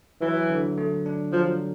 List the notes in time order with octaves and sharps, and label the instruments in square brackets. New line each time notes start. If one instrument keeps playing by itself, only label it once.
[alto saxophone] E3 [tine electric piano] F#3
[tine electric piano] D3
A3
D4
[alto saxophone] F3 [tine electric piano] F#3